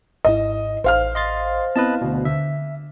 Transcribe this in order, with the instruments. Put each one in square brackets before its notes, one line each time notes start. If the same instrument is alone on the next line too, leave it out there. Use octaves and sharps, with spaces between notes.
[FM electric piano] G#1 G#2 E4 [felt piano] D#5
[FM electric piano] A1 [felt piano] C5 F5 F6
[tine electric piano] D#5 C6 A6
[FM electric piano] B3 C4 E4 [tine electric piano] B4 D#5 A5
[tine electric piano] D2 B2
[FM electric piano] D3 [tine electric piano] E5